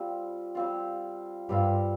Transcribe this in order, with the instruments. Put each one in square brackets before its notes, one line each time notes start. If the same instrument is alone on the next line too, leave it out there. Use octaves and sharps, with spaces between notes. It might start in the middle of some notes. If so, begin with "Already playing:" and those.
Already playing: [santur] G3 C4 F4
G3 C4 F4
[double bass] G2 [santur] G3 C4 F4